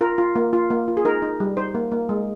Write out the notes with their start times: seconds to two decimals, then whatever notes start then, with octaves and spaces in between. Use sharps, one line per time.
0.01 F4 A#4
0.18 F4
0.36 A#3
0.53 F4
0.70 A#3
0.88 F4
0.97 G#4
1.05 D#4 A#4
1.22 D#4
1.40 G3
1.57 D#4 C5
1.75 A#3
1.92 A#3
2.09 G#3